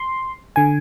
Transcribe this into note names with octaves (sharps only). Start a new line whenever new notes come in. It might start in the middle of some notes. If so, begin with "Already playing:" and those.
Already playing: C6
D3 G#5